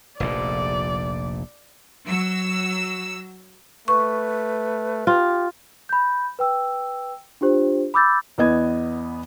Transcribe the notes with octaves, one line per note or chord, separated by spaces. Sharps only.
F1 A#1 A#2 D5
F#3 E6
A3 B4 C#6
F4 G4
B5 G6
B4 G5 E6
D4 F4 G4 C5
B5 D6 E6 G6 A6
E2 B3 D#5 G#6